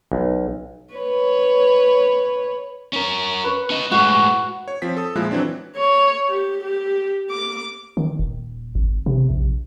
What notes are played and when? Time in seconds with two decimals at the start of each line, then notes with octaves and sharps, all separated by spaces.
0.12 B1
0.94 B4 C#5
2.93 C#4 A#4
3.44 B4 C#5
3.70 C#4 D#5
3.91 A2 G#3 F#4
4.68 C#5
4.82 F3 C4 B6
4.97 A4 D#6
5.15 A#2 F3 G#3 E4 F#6
5.31 E3 F#3 C4 D4
5.76 C#5
6.29 G4
6.64 G4
7.30 D6
7.97 D#3
8.19 D#1
8.75 G#1
9.06 C3
9.30 A#1